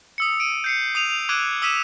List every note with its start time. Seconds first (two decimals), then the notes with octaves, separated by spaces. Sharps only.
0.18 D#6 E6 C#7
0.40 D7 D#7
0.64 G6 C7 C#7
0.95 D#6 D#7 F7
1.29 D6 E6 F#6 G#6 D7 D#7
1.62 D#6 E6 B6 D#7 E7